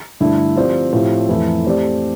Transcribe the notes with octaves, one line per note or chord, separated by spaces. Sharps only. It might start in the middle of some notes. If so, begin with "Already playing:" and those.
G2 D3 A3 E4 A4
F3 C4 G4 D5
A2 F3 C4 G4
F2 E3 A3 E4
A3 C4 G4 D5